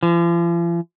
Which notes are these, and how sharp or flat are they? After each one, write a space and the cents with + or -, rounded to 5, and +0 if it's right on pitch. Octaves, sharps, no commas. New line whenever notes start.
F3 -45